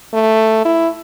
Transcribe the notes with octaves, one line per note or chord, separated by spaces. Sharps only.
A3
E4